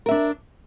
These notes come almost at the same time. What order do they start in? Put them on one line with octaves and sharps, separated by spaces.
A#4 E5 D4